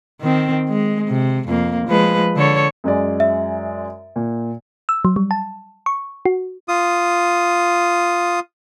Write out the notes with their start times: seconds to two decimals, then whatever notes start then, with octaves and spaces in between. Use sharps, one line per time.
0.21 D#3 C4
0.69 G#3
1.08 C3
1.48 F2 A#3
1.88 F3 G#3 B4
2.36 D3 A4 C#5
2.84 F#2 G#3 D5
3.20 E5
4.16 A#2
4.89 E6
5.05 F#3
5.16 G3
5.31 A5
5.86 C#6
6.26 F#4
6.68 F4 D#6